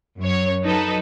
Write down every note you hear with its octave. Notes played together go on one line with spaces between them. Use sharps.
F#2 C#5
F#3 D#4 A4 B4